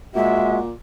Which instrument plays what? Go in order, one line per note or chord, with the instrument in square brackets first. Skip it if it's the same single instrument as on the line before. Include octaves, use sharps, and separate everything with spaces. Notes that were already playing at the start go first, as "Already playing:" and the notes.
[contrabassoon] A#2 [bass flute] G#3 [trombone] F#4 [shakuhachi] E5